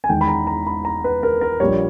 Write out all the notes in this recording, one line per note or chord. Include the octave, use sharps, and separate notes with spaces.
G#5
E1 E2 D#3 G#3 G5
B5
A#5
A#5
B5
A#5
B4
A#4
A#4
A#1 A#2 G3 C#5